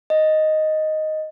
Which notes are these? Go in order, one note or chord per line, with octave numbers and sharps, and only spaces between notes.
D#5